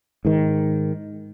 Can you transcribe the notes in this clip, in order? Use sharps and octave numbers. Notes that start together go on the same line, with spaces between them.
G#2 D#3